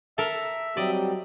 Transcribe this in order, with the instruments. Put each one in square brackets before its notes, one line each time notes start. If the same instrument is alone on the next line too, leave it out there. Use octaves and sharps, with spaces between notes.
[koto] A4 A#4 [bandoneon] E5
[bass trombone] F#3 [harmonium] G3 C4 G4 [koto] D5 D#5